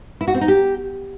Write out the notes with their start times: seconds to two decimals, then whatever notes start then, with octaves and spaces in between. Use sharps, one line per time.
0.21 E4
0.28 F#4
0.34 C4
0.41 D#4
0.48 G4